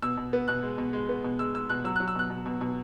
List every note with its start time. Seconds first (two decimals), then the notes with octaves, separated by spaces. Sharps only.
0.02 B2 E6
0.17 B2
0.33 B3
0.48 B2 F#6
0.63 G#3
0.78 B2
0.93 G#3
1.09 B3
1.24 B2
1.39 G#3 E6
1.55 G#3 E6
1.69 B2 F#6
1.84 F#3 E6
1.96 F#6
2.00 F#3
2.08 E6
2.15 B2 F#6
2.30 B2
2.46 B2
2.61 B2